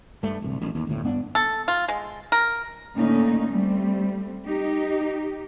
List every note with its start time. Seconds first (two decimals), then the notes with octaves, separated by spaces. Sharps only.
0.23 G2 A3
0.42 D1 C2
0.62 A1
0.75 D#2
0.87 G1 D2 A2
1.04 G2 B3 D4
1.35 A4
1.68 F4
1.88 G#3
2.32 A#4
2.96 A2 D3 A3 A#3 C#4 D#4
3.50 G3 A3 C4
4.45 D#4 G4